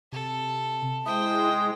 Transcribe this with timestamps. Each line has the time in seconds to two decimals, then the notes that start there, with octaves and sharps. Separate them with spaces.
0.13 C3 A4
1.06 G#3 E4 C5 G5 D#6